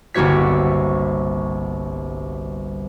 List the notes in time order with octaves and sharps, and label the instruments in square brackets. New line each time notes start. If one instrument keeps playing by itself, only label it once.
[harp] G1 C2 A#3 F#4 C#5 B6